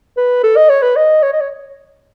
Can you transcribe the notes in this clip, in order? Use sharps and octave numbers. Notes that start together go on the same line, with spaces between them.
B4
A4
D#5
C#5
B4
D#5
C#5
D#5
C#5